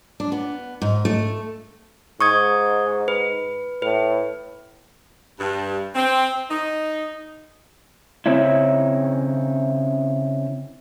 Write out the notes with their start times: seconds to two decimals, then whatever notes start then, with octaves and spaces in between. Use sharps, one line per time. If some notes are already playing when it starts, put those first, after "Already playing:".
0.20 D4
0.32 B3
0.82 G#2
1.05 A3
2.21 G#2 C#6 D#6 G#6
3.08 B4
3.82 A2 B4
5.39 G2
5.95 C4
6.51 D#4
8.26 C#3 C4 C#4 D#4 E4